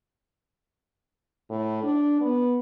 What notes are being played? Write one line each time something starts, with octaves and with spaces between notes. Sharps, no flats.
A2
D4
B3